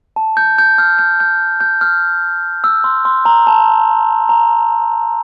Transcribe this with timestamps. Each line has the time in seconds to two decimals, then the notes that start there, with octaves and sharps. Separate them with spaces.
0.16 A5
0.37 G6
0.58 G6
0.78 F6
0.99 G6
1.20 G6
1.60 G6
1.81 F6
2.64 E6
2.84 C6
3.05 C6
3.25 A#5
3.47 A5
4.29 A#5